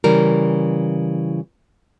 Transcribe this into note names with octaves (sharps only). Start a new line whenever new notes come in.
C#3 E3 G3 A#4